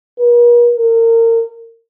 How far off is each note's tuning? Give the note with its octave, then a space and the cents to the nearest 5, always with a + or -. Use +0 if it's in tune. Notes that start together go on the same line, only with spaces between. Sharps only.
A#4 +45
A#4 -30